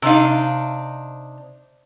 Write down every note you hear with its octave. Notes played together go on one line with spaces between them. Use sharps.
C3 D4 D#4 F5